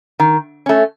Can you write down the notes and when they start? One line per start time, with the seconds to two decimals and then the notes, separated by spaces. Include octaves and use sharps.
0.20 D#3
0.66 A3 C#4